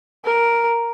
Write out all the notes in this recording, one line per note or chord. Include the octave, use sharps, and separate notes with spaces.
A#4